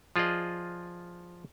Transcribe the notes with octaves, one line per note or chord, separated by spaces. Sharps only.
F3 F4 G#4 D5 D#5